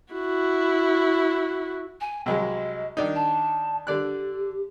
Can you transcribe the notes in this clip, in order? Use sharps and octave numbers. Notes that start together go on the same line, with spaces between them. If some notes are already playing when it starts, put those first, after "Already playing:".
E4 F#4
G#5
C2 F#3 G#3 D#5
D#3 D4 D#4
A5
D3 G4 D5 F#6